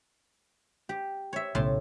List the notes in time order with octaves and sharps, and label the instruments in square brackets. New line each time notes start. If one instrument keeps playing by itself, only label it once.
[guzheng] G4
C#5 E5
[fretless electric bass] B1 C#3 [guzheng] A2 A5 C6